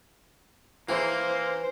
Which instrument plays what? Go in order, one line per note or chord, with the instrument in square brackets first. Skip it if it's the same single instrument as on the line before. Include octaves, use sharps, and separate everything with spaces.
[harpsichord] E3 [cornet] A#3 [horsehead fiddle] C5